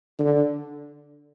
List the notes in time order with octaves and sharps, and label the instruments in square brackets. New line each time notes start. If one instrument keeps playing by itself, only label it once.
[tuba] D3